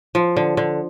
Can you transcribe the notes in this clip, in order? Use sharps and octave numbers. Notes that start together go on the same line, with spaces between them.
F3
D3
D3